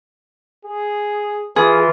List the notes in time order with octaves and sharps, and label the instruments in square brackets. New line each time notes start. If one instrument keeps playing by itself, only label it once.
[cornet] G#4
[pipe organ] E3 F4 [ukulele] G#4